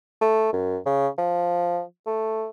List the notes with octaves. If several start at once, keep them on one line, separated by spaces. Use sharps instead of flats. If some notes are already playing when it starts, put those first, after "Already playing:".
A3
F#2
C#3
F3
A3